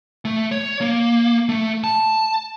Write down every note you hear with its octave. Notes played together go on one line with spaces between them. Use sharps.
A3
C#5
A#3
A3
A5